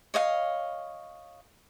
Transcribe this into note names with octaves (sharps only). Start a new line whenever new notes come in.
C#5 D#5 F5